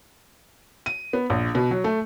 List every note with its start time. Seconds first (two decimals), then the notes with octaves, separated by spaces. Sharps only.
0.86 D#7
1.13 B3
1.30 A#1
1.55 B2
1.71 F#3
1.84 A3